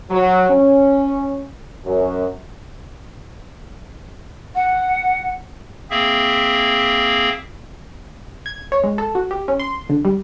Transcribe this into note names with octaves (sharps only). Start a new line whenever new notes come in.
F#3
C#4
F#2
F#5
A#3 C4 G#4 E5
G#6
C#5
G#3
A4
F#4
G4
C#4
C6
D3
G3